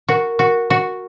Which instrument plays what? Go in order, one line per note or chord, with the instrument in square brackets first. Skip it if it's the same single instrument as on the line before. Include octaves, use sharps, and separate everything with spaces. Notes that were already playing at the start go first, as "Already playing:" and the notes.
[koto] F#4 [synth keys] A#4
[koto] F#4
F#4